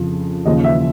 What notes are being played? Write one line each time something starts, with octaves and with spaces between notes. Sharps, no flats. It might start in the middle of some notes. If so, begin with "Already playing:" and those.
Already playing: F2 C#3 F3
D#2 C#3 F3 D#5
E5